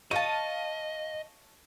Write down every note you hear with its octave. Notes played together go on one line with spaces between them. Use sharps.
C#5 D#5 F5 A5 D#7